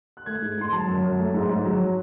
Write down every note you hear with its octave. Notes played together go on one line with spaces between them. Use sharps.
F#6
A3 G#6
G#2
G#2 C6
F#3 A5
F#2
F#2
A3
G#2
G#2
F#3